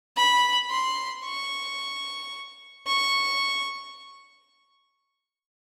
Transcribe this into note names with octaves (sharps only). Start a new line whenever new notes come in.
B5
C6
C#6
C#6